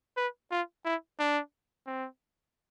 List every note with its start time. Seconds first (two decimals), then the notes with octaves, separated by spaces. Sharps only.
0.17 B4
0.51 F4
0.85 E4
1.19 D4
1.87 C4